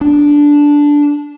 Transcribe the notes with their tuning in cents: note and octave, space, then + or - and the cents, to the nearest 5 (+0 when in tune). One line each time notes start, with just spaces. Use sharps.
D4 -10